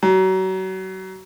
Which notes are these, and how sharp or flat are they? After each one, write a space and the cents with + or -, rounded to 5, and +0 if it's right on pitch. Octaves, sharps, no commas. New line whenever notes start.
F#3 +30